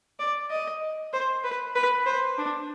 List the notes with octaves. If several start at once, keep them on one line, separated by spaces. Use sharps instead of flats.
D5
D#5
C5
B4
B4
C5
D4